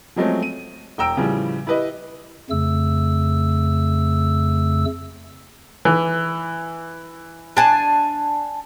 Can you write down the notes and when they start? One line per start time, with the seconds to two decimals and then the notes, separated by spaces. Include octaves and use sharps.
0.16 F3 F#3 G#3 A3 C4 C#4
0.43 D#7
0.98 E1 G5 A#5 E6 D7
1.16 A2 C#3 E3 F3 G3
1.67 E4 G4 B4 D#5
2.50 F2 C#3 A3 E6
5.85 E3
7.57 D4 G#5 A5